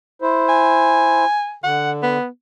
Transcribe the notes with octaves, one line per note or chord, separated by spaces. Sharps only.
E4 C5
G#5
D3 F#5
B3